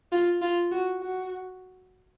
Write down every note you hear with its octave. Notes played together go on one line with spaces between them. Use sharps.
F4
F4
F#4
F#4